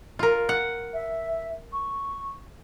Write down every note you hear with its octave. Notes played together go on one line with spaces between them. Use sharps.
F4 A#4
F#5
E5
C#6